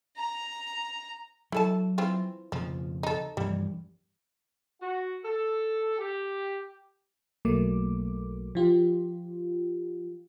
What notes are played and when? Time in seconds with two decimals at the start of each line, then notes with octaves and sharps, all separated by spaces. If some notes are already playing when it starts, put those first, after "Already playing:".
0.17 A#5
1.52 F#3 E4 A4 A5
1.98 E3 C4 F4
2.52 F2 C#3 F3
3.03 D#4 A4
3.37 G2 E3 F3 G3
4.81 F#4
5.23 A4
5.99 G4
7.45 B1 F#3 A3 A#3 D6
8.55 F3 F4 G4